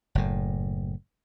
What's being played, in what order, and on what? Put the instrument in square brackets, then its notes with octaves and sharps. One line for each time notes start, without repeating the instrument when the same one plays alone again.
[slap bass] F#1 A2